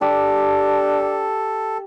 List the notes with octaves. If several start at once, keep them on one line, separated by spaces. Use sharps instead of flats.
D4 G4 A4